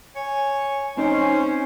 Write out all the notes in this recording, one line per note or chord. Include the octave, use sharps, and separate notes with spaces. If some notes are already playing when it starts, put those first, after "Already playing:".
C#5 G#5
C4 C#4 D#4 C5